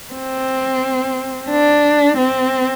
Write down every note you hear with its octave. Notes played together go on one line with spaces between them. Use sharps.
C4
D4
C4